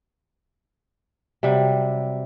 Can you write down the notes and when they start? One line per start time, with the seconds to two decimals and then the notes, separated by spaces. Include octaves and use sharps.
1.43 C3 F#3 G3